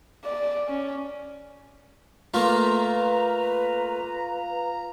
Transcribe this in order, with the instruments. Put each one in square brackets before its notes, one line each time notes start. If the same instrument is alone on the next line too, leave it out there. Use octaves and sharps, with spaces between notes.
[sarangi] D5
C#4
[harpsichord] A3 A#3 [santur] F4 [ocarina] B4 [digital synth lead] A#5